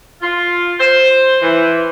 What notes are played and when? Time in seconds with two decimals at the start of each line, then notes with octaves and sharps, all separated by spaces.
0.22 F4
0.80 C5
1.42 E3